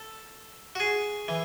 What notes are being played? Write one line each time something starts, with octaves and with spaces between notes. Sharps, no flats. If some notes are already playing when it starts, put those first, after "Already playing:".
Already playing: A4
F#4
G#4
E3